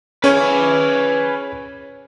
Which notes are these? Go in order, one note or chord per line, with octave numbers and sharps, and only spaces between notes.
C#4 G#4 B4 C#5 G#5